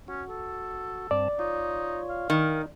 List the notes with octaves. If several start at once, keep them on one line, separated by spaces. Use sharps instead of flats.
C#4 F#4
A4
G2 C4 D5 A5
D#4 F4 C#5
F5
D#3 D#4